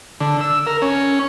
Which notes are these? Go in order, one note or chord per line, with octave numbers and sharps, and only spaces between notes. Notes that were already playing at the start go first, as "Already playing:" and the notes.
D3
E6
A#4
C#4